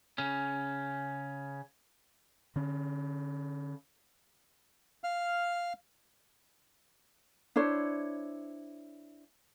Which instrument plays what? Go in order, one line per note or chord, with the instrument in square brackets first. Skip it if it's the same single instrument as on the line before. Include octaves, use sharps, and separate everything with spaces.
[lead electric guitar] C#3 C#4
[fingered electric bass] D3 C#4
[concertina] F5 F6
[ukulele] D4 E4 C5 C#5